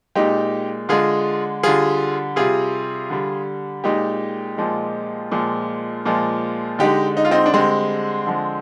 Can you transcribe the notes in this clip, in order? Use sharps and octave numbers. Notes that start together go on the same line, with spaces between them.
A#2 G#3 D#4 G4
D3 G#3 F4 G#4
D3 G3 F4 G#4
C3 G3 F4 G#4
D3 G3
A#2 G#3 D#4 G4
A#2 F3 G#3
A#2 F3 G#3
A#2 F3 G#3
D3 G#3 D#4 G4
D#4
F4
C4 D#4
D4
D3 G3 G#3 C4
D3 F3 G#3